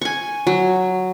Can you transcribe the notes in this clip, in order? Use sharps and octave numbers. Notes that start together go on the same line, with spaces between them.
G#5 C#6
F#3